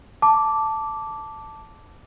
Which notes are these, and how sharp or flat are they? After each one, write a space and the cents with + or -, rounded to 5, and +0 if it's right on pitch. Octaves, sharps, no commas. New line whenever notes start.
A5 +0 D6 -5